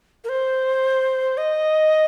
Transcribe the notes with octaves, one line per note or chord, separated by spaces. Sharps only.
A#4
C5
D#5